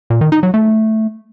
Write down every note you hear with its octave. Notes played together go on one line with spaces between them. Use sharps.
A#2
D#3
D#4
F#3
A3